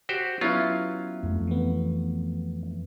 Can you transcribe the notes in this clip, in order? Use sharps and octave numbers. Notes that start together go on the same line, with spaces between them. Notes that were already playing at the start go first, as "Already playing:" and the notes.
F#4 G4 C5
F#3 B3 C#4 E4 F4
F2 A3
E3 B3